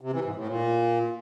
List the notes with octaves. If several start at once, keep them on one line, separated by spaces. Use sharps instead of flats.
C3
E3
G#2
A2
A#2